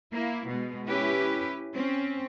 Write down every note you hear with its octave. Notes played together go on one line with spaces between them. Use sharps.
A#3 E4
B2 G#3
C#4 E4 G4 B4
C4 C#4